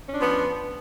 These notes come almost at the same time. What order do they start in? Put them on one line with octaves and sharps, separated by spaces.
C#4 D4 F3 B3